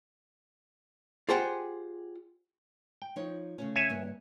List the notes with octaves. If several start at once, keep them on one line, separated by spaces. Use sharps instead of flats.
F4 G4 G#4 C5 F#5 G5
G5
F3 D#4 C#5
C#3 A3 C#4
C#5 E5 G#5
G2 A#3